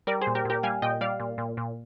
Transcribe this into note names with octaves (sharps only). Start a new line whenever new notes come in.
G3 A#4 D5
G#4 C5
A#2
G4 A#4
A#2 G4 A#4
G3 F5 G#5
A#2 D#5 G5
G3 D5 F5
A#2
A#2
A#2